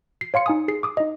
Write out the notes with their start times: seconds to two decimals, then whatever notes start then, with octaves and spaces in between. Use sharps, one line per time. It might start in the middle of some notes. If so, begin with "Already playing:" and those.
0.21 C7
0.34 C#5 F5 C6 C#7
0.46 D#4 G#5 D#6
0.68 G#4 C7
0.83 D6 D#6
0.97 D#4 D#5